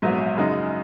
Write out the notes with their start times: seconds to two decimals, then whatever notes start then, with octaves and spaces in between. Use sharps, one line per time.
0.02 A#1 G#2 F#3 B3
0.37 F#2 C#3 G#3 D#4